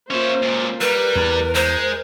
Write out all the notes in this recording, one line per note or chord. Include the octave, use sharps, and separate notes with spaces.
A#3 C#4 F4 C5 E5
C#2 A#2
G3 A#4 B4
E2
G#3 C5